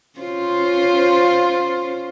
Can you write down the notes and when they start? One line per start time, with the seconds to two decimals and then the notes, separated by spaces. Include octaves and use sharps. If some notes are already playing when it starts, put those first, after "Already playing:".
0.19 C#4 F4 C5